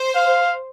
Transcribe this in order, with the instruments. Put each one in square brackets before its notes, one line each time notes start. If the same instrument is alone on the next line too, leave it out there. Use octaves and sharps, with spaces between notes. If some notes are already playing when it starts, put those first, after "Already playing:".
Already playing: [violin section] C5
[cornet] F5